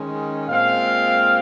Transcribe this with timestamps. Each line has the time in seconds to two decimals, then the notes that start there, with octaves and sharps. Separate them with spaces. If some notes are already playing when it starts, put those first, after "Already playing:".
Already playing: D#3 G#3 C#4
0.49 A#2 G#3 C4 F5